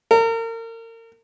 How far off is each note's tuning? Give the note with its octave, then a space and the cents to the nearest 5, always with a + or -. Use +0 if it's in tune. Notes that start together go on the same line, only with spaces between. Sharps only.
A#4 -35